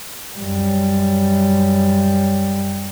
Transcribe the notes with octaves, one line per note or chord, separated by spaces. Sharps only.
F#2 G3